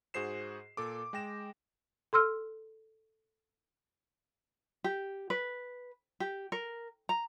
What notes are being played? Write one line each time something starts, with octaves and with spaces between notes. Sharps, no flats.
G#2 F#4 G#4 C5 C7 E7
A#2 A4 D6
G#3 G5 A#6 E7
A4 C6 E6 F6
G4
B4
G4
A#4
A#5